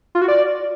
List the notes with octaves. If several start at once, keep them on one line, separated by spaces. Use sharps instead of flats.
F4
F#4
D5